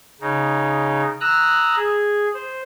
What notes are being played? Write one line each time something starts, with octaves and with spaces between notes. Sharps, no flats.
C#3 D#4
A#5 D#6 E6 F#6
G#4
C5